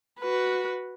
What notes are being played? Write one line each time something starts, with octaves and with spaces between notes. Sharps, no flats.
F#4 B4